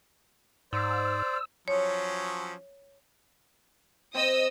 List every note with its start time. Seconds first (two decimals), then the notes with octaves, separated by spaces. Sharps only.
0.73 G#2 C5 D5 E6
1.68 F3 F#3 C#4 C#5
4.15 C4 D#5 D#6 E6